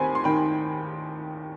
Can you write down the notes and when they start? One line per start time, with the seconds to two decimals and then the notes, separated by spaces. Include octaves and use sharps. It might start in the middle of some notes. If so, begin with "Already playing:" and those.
Already playing: D#2 C4 G#5 B5 C6
0.15 C6
0.24 D#3 G5 B5